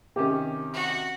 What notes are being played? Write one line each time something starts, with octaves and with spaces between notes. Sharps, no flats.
C3 D#3 C#4 G4
F#4